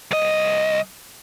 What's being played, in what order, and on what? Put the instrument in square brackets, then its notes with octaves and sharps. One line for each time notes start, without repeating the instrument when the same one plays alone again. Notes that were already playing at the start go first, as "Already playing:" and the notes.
[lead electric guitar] C2 D#5